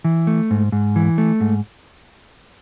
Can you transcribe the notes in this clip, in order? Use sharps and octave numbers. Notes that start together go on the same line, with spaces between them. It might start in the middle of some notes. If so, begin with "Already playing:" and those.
E3
A3
G#2
G#2
E3
A3
G#2